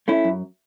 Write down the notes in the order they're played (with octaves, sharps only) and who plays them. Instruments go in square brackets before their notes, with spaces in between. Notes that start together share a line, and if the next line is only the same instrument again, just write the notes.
[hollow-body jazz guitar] A3 C#4 E4
F#2